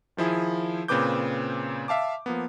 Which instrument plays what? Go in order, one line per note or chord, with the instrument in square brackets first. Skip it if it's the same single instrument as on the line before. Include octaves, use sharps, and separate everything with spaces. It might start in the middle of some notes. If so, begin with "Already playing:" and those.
[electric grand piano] D#3 F3 E4 G#4
A#2 C#3 C4 B4 D6 G6
E5 F5 A5 D6
F3 A#3 B3